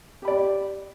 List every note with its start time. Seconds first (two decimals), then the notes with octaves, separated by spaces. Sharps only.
0.22 G4
0.25 B5
0.28 D5